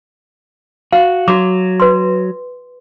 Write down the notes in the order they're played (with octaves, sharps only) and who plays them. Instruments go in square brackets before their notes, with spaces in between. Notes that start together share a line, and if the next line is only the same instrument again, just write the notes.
[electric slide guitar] F#4 [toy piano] F5
[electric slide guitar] F#3 [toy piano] F#4 D6
[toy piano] B4 C6